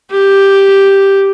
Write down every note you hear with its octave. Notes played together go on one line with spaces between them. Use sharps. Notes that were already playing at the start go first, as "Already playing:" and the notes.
G4